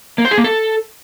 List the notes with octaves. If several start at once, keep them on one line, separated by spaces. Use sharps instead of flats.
A#3
C5
G#4
A#3
A4